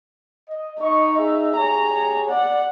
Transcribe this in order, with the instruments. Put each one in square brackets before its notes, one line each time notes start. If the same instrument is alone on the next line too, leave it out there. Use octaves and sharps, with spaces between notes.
[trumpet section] D#5
[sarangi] D#4 [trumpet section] D#5 C#6
[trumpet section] G#4 E5
[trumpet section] G4 G#4 C#5 [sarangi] A#5
[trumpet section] D5 [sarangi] F#5